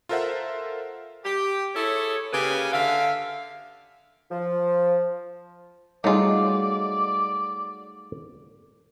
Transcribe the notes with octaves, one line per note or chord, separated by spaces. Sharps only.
F4 A4 A#4 C5 E5 F#5
G4
E4 G#4 A4 C#5
C#3 A#3 G4 B4 G#5
D3 E5 F5
F3
F#3 G3 A3 D#4 F4 G#4 D5